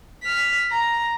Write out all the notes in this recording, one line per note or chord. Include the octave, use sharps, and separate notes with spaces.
F6 B6
A#5